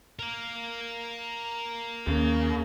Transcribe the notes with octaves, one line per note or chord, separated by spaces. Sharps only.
A#4 F5
D#2 C#3 A#3